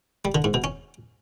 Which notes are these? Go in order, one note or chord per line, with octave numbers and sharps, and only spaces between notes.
G3
D3
G#2
B2
C#4